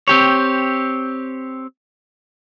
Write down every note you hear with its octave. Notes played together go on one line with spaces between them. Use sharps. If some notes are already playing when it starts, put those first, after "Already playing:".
C4 G4 C#5